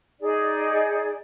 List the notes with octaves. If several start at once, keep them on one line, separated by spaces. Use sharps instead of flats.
D#4 G#4 D5